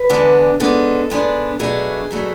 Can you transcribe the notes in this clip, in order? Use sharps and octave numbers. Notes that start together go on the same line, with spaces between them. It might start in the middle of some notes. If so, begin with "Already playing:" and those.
Already playing: B4
E2 D3 G#3 B3 D4
G#2 G#3 B3 D4 A4
G#2 G#3 B3 D4
B2 F#3 A3 D4 G#4
B2 F#3 A3 D4